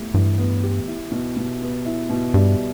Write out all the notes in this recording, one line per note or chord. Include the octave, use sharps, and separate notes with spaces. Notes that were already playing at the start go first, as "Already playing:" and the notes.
Already playing: A2 B3 G4
G2 E3
B3
G4
E4
B2
B2
B3
E4
B2
G2 G3